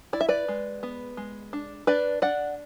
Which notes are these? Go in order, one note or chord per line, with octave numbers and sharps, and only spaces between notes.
E4 D5
E5
B4 D5
G#3
B3
G#3
D4
D4 B4 D5
D4 D5 F#5